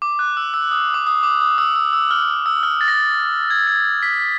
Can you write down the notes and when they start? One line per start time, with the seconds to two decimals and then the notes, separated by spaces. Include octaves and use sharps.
0.02 D6
0.19 F#6
0.37 E6
0.54 E6
0.71 D#6
0.94 D6
1.07 D#6
1.23 D6
1.41 D#6
1.58 E6
1.76 E6
1.93 E6
2.11 F6
2.46 E6
2.63 F6
2.81 A6
2.88 A#6
2.95 A6
3.50 G#6
3.67 G#6
4.03 B6
4.20 B6